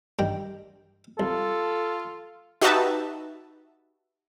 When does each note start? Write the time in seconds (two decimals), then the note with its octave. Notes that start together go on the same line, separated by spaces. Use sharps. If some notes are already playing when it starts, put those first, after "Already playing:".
0.19 G2 D#3 G5
1.20 C2 F4 A4
2.61 D#4 F#4 G4 B4 E5 A5